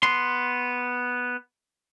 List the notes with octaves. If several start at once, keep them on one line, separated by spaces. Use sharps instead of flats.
B3 C6